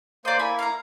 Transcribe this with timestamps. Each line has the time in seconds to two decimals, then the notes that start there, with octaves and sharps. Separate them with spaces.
0.25 A#3 C5 D5 D#5
0.39 A#3 E4 G#5 B5
0.59 F5 A#5